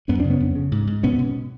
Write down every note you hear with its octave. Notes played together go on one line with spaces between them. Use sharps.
F#2 B3 C#4
C4 D4
C#3
B3 C#4
F2
C#3
G#2
G#2
B2 B3 C#4
B2